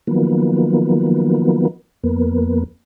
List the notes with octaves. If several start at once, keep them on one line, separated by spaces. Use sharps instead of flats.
D#3 F3 F#3 A#3 B3
F2 A#3 B3